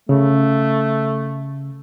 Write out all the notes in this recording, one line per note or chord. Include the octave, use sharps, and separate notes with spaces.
C#3 A3